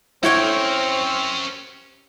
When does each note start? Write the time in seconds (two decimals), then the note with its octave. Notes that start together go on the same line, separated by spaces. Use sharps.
0.23 C4 C#4 E4 G4 A#4 C#5 G5